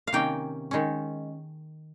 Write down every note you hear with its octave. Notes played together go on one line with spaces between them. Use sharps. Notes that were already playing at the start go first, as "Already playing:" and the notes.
F5
C3 D#3 A#3 C#4 G5
D#3 G#3 C#4